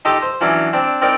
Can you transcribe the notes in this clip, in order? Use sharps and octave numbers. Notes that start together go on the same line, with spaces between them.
D#4 G4 A4 D#5 A5 C6
C5
E3 F#3 C#4 D4
C4 D4
C4 D#4 A#4 D5